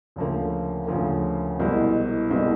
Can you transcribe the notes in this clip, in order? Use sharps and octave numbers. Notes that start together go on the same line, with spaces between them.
D2 C#3 F3 A#3
D2 C#3 F3 A#3
C2 B2 G#3 C4 E4
C2 B2 G#3 C4 E4